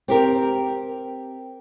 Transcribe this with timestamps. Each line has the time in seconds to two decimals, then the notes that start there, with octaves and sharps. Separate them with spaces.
0.08 C4 G4 A#4